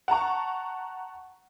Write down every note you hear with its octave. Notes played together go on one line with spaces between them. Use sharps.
F#5 A5 A#5 C#6